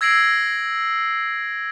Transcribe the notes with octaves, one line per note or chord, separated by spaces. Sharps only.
E6 G#6 A#6 C7 D7 F#7